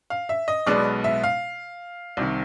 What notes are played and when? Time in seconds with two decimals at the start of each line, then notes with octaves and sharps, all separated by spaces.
0.10 F5
0.29 E5
0.48 D#5
0.66 B1 B2 G#3 B3 D5
1.04 E5
1.24 F5
2.17 C2 C3 D#3